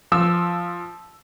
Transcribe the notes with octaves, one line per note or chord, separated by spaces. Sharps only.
F3 E6